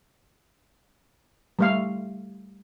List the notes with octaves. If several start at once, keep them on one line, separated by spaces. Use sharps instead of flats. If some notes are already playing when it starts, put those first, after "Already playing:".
G3 A3 F5